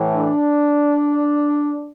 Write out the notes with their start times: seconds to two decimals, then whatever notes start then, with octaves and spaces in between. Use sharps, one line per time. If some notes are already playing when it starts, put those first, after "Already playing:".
Already playing: A2 E3
0.16 D4